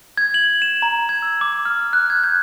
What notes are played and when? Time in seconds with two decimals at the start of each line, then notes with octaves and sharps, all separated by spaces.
0.18 G#6
0.34 F#7
0.62 E7
0.82 A#5
1.09 G#6
1.22 E6
1.41 D6
1.65 F6
1.93 F#6
2.10 G#6
2.24 G6